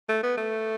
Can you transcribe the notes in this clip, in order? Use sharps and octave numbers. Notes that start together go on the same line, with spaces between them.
A3
B3
A3